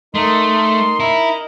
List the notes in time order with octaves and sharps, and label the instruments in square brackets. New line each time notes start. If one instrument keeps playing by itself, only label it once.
[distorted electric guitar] A3 [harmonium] D#4 A#4 D#5 [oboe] C6
[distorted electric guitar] E4 [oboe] A#5